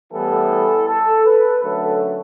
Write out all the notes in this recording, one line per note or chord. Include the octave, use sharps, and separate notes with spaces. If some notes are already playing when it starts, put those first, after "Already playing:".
A2 E3 G3 B3 A4
A4
B4
F#2 D3 F#3 A3 A4